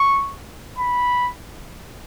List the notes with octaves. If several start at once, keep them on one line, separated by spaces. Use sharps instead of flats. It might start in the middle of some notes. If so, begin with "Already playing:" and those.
Already playing: C#6
B5